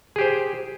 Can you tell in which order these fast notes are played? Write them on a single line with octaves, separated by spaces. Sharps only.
G#4 G4 C5